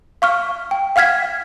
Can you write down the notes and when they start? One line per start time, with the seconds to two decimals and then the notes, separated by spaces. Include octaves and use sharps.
0.22 F5 C#6 F6
0.71 G5
0.96 F5 F#5 F6 G#6 B6